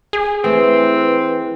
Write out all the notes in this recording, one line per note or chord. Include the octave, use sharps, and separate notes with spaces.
G#4
E3 A3 C4 B4